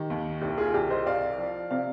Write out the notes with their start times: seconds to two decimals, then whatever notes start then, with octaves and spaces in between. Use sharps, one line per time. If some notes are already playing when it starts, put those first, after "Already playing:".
Already playing: D#3 G4
0.10 D#2
0.41 C2 G4
0.58 F4 G#4
0.74 C2 G4
0.90 C5 D#5
1.06 C2 D5 F5
1.38 F3
1.71 C3 D5 F5